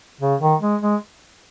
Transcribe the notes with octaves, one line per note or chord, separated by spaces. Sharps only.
C#3
D#3
G#3
G#3